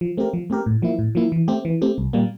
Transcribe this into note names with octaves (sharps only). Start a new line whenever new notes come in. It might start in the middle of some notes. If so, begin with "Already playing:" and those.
F3
A3 C4 G4 A#4
F3
A3 C4 G4 A#4
A2
F3 A#3 E4
A2
F3 A#3 E4
E3
A3 C4 G4
E3
A3 C4 G4
C2
A#2 G3 A#3